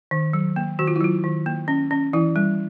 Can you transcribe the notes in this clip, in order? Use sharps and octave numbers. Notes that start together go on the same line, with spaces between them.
D#3
F#3
A#3
D#3 F#4
F4
E4
F#3 F4
D#3
A#3
C#4
C#4
E3 E4
G3